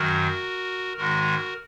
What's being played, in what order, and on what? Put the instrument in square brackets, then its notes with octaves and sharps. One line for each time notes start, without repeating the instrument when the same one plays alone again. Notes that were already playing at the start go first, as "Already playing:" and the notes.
Already playing: [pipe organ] F#2 D#3 F#3 F#4 A#4
G#2 D#3 G#3 F#4 A#4